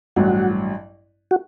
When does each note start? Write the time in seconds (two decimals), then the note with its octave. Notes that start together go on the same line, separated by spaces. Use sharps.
0.16 A1 G2 F#3 F#4
1.31 F#4